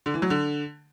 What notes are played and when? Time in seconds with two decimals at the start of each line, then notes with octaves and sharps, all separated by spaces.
0.06 D3
0.14 E3
0.22 F#3
0.30 D3